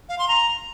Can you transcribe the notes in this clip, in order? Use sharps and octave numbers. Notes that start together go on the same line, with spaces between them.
F5
C6
A#5